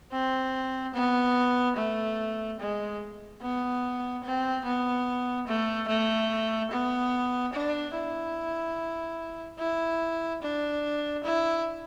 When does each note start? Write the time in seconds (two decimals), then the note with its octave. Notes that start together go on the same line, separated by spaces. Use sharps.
0.12 C4
0.94 B3
1.77 A3
2.59 G#3
3.42 B3
4.24 C4
4.65 B3
5.48 A3
5.88 A3
6.72 B3
7.53 D4
7.95 E4
9.59 E4
10.42 D4
11.24 E4